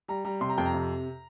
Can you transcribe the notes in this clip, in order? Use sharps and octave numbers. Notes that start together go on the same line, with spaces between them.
G3 A#5
G3 A#5
C3 C6
A#5
F2 G5
A#5
C3